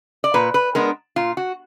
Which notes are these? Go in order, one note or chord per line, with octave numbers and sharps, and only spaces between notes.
D5
A#2 B4
B4
G#3 B3 D4 A#4
A#2 F4
F#4